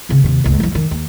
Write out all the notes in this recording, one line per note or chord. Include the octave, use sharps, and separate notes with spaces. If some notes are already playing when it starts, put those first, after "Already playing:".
C#3 C4
D#2 C3
F#1 C#2
E2 F#3
F2 D#3
D#2